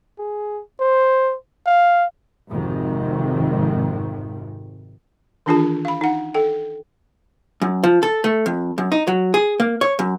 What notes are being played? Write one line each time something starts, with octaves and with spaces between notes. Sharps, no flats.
G#4
C5
F5
G#1 F2 G#2 C3 D#3
D#3 E3 D4 F4 G#4 A5
F5 B5
D#4 F#5
A4 G5
F#2
F3
A4
A3
F2
F#2
D#4
F#3
G#4
A#3
C#5
F#2